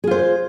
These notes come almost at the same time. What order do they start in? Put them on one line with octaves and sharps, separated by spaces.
G#4 F4 C5